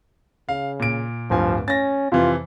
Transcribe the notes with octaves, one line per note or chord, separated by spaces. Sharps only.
C#3 F5
A#2 D7
D1 G2 F3 G#5
C#4 A6 A#6
F2 C3 E3 F4